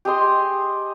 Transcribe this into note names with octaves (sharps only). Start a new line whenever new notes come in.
G4 G#4 D#5 C6